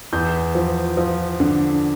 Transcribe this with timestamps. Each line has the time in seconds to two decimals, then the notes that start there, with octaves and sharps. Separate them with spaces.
0.13 E2 G6
0.55 F3
0.97 F3
1.40 D3